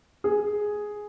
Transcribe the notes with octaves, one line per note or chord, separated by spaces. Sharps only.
G#4